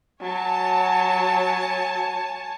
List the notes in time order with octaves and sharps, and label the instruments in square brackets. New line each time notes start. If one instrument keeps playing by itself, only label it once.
[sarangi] F#3 [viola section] C#5 G#5 A5